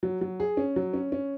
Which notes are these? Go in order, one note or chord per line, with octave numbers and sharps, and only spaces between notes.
F#3
F#3
G#4
C#4
F#3
C#4
C#4